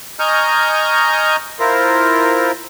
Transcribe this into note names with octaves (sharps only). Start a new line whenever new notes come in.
D#5 G#5 A#5 C#6 F6 G6
E4 F4 A#4 C5